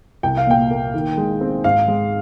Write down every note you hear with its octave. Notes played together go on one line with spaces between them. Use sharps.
C2 G5
F5
A#2 G5
A#3
D#3
G#3
C4
G#2 F5
G#3